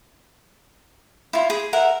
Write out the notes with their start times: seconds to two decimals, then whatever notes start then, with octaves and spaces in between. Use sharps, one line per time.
1.33 E4 F4
1.50 G#4
1.73 A#4 E5 F#5